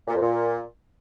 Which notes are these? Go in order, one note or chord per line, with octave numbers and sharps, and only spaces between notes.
A#2
F2
A#2